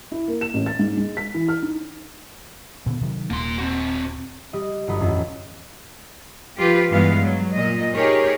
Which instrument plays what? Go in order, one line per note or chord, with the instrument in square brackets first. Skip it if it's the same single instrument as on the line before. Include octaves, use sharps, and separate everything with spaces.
[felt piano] E4
A#3
E7
A1
A6
G#2
G#3
B6
E3
F6
D#4
[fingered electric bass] A#2 D3 B3
C3 D#3 F#3
[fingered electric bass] D#1 [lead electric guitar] A#3 C6
[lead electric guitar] C4 F#4
[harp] G3 D#5
G1 F#3 B4 D#5
A1 F2 C#4 F4
[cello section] F3 F4 G4 B4
G2 E3 G#3 B3 F5
F#3
A#2 D#5
D#4 G4 G#4 A#4 C#5